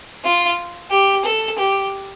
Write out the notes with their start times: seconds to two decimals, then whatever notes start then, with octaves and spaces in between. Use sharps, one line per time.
0.25 F4
0.91 G4
1.25 A4
1.58 G4